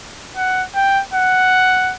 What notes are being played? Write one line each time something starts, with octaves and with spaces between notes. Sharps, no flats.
F#5
G5
F#5